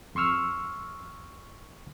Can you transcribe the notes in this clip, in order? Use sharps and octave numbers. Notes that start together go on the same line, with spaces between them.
F2 C6 C#6 E6 F6